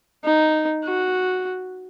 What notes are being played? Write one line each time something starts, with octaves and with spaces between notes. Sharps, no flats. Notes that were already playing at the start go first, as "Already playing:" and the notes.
D#4
F#4